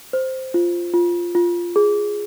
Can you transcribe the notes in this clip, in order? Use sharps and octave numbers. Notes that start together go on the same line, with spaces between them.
C5
F4
F4
F4
G#4